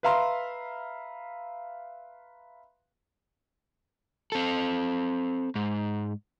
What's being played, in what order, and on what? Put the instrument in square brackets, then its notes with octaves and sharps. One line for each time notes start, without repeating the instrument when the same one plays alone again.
[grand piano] B4 E5 F5 A#5 C6
[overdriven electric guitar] C4 A4
G#2